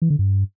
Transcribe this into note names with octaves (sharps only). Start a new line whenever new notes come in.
E3
D3
G2